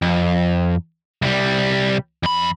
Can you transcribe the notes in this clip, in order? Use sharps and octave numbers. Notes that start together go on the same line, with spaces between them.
F2
C2 G3
F2 B5